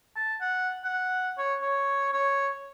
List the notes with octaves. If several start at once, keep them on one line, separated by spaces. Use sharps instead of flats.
A5
F#5
F#5
C#5
C#5
C#5